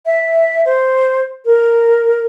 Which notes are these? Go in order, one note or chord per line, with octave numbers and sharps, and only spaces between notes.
E5
C5
A#4